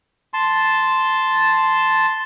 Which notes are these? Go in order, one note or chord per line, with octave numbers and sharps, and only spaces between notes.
A5 C6